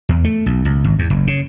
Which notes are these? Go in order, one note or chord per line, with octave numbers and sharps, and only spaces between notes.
E2
A3
B1
C#2
G#1
E2
F#1
C#3